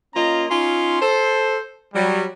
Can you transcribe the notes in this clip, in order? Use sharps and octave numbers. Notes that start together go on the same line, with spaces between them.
A#3 C#4 F4 D#5 A#5
C#4 D#4 F4 C6
A4 C5
F#3 G3